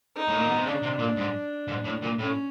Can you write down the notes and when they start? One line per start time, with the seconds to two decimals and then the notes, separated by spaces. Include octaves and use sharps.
0.15 D#4
0.29 A2
0.38 A#2
0.48 B2
0.56 C3
0.66 C#3 D4
0.83 C3
0.99 A#2
1.18 G#2
1.68 G#2
1.85 A2
2.03 A#2
2.19 A2 C#4